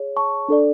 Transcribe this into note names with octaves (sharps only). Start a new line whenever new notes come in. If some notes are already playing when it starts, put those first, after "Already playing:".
Already playing: G#4 C#5
A5 C#6
D4 A4 D5